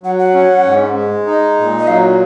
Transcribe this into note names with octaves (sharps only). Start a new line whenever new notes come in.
F#3 F#5
F#5
C#4
G#2
G#3
D#4
A#2
D#5
F#3 F5